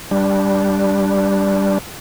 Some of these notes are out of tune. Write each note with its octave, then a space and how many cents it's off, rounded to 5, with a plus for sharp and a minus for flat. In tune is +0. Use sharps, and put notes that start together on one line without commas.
G3 +0 D4 -10